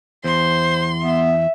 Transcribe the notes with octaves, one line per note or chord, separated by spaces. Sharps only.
E2 C5 C6
B3 E5